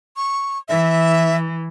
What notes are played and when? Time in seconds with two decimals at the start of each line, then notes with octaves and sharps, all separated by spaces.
0.16 C#6
0.69 E3 E5